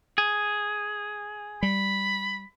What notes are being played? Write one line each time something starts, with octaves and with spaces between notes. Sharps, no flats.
G#4
G3 B5